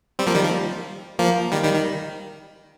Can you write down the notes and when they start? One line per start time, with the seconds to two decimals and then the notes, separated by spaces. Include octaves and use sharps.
0.19 G3 C4
0.27 F3 A#3
0.35 D#3 G3
0.44 F3
1.19 F3 A#3
1.52 D#3 G3
1.64 D#3 G3
1.74 D#3